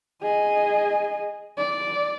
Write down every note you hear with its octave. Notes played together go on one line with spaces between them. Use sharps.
G#4 D#5
D5